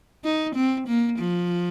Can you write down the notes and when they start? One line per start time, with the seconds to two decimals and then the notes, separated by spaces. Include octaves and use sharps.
0.24 D#4
0.55 C4
0.87 A#3
1.19 F3